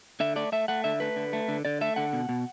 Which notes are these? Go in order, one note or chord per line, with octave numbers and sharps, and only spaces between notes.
D3 E5
A3 D5
A3 E5
A3 F#5
D3 E5
A3 B4
D3
A3
D3
D3 D5
A3 E5
D3 F#5
B2
B2